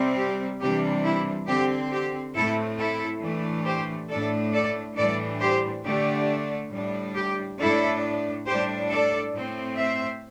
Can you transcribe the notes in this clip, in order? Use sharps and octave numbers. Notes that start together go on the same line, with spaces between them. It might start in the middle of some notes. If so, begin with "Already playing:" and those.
Already playing: C3 G3 C4
G4
C3 E3 G3 D4 G4
E4
D3 C4 G4
G4
A2 A3 C4 E4 A4
E4 A4
A2 E3 A3 D4
G4 C5
A2 A3 D4 A4 D5
A4 D5
A2 E3 G3 D4 A4 D5
G4 C5
D3 A3 D4 G4
A2 G3 D4
G4
A2 A3 D4 E4 A4
A2 G3 D4 G4 C5
A4 D5
A2 A3 C4
C5 E5